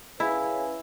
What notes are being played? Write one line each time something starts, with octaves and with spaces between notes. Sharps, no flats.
C#4 E4 G#4 B4 F5 G#5